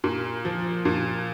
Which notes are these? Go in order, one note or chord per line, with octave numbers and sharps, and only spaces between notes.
A#2
F3
A#2